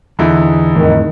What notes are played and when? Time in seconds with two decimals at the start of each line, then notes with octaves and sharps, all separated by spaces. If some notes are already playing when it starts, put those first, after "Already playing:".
0.19 E2 D3 D#4 E4
0.76 F2 A2 D#3